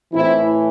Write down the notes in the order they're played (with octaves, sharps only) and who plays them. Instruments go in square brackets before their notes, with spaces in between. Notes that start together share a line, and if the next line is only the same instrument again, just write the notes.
[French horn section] A2 E3 C4 E4